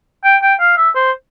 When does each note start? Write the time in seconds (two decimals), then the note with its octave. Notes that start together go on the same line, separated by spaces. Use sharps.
0.24 G5
0.42 G5
0.60 F5
0.77 E5
0.95 C5